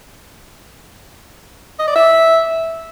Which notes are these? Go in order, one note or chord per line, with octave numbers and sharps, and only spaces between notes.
D#5
D5
E5